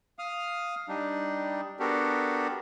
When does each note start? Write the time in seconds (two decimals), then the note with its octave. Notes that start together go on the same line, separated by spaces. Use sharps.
0.19 F5 D#6 F6
0.88 G3 D4 D#4
1.80 B3 D4 F#4 G4 A4 A#4